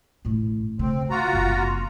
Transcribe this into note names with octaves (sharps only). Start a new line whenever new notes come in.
A1 A2
C#3 A3 C4
D3 F4 F#4 A#5
F#1 C3